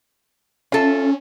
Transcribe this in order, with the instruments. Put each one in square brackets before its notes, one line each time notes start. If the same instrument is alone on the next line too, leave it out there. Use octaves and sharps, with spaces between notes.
[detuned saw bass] C#4 [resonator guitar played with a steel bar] F4 A4 E5